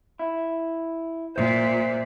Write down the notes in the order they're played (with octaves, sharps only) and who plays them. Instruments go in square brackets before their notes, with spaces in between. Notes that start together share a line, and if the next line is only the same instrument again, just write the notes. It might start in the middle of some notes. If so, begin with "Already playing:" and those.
[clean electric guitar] E4
[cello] A#2 [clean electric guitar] C5 E5